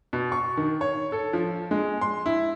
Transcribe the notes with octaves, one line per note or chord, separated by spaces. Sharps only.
B2
C#6
D#3
C#5
A4
F3
G#3
C6
E4